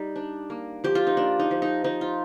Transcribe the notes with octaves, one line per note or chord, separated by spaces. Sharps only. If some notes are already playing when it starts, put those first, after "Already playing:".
Already playing: G3 D#4
D4
A#3
F3 G4
F4
D#4
A#3 D4
D#4
F3
D#4
F3 D#4
F4